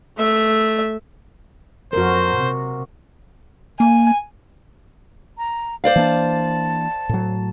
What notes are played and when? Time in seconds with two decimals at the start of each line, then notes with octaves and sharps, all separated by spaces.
0.17 A3 E5
1.93 F2 F#4 A#4 C5
2.35 C3
3.80 A#3 G#5
5.38 A#5
5.84 C5 D5 F5
5.96 E3 A#3 D4 A5
7.09 A2 F#3